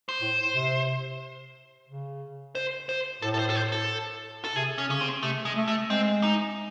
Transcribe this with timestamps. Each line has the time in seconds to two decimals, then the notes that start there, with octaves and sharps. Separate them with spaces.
0.09 C5
0.21 A2
0.55 C3
1.89 C#3
2.55 C5
2.89 C5
3.22 A2 A4
3.34 A4
3.39 C5
3.50 A4
3.56 C5
3.72 A4
4.44 A4
4.56 C3 G#4
4.78 C#4
4.89 C#3 C#4
5.01 C4
5.23 C3 A3
5.45 G#3
5.56 A3
5.68 A3
5.90 G#3 C4
6.23 D#4